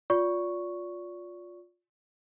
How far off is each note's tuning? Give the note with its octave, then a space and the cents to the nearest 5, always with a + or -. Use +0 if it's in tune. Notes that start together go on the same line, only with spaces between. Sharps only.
F4 +20 D5 -30 C#6 +0